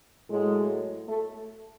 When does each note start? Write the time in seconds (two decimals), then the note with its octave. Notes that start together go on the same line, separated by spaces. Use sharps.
0.30 A2 F#3 G#3
1.08 A3